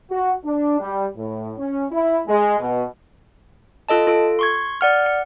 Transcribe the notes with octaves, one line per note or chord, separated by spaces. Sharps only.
F#4
D4
G3
A2
C#4
E4
G#3
B2
F4 A4 D#5 A5
F4 A4
C6 C#6 G#6
D5 F#5 F6
F#5